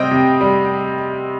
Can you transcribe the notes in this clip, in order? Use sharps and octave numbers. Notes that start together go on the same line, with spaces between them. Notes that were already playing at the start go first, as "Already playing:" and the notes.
Already playing: C3 G3 C4 D#5 G5
C3
G3